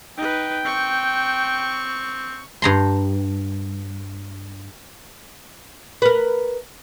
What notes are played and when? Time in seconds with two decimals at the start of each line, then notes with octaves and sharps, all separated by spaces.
0.18 D#4 B4 G5
0.65 C4 C#6
2.62 G2 A#5 C6
6.02 A#4 B4